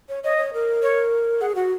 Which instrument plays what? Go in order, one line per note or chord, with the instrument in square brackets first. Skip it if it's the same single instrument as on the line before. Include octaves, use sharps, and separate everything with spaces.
[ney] C#5
[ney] C#5 [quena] D#5
[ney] C#5
A#4
[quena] C#5
[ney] G#4 [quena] F#5
[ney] F#4 [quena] F#5